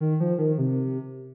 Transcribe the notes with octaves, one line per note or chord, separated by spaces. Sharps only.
D#3
F3
D#3
C3